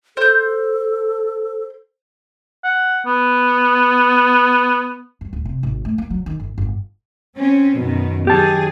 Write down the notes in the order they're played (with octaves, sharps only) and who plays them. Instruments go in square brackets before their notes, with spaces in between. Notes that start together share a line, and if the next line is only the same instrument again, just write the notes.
[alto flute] A4 [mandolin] C5 G6
[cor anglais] F#5
B3
[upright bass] G2
D1
C3
G#1
A3
A#3
F#3
D#3
G1
G1
[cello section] C4 C#4
F#2 B2 D#3
[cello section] D#3 F#3 G#4 [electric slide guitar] G4 A5